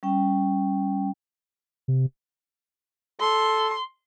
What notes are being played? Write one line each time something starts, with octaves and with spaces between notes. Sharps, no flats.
G3 C#4 G5
C3
A4 C6